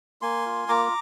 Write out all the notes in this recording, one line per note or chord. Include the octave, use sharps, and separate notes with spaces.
A#3 G#5 C6
F4
A#3 A#5 D6